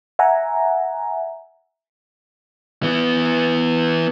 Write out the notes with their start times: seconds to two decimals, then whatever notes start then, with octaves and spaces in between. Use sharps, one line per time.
0.19 E5 F#5 G#5 A#5
2.83 E3 B3